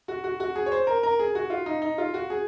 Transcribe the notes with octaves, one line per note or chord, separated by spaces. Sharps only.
F#4
F#4
F#4
G#4
C#5
C5
A#4
A#4
G#4
F#4
F4
D#4
D#4
F4
F#4
G#4